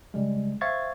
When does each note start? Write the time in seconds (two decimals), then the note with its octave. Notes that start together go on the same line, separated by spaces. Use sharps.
0.14 C#3 G3 G#3
0.61 C5 E5 F5 C#6 G#6 A6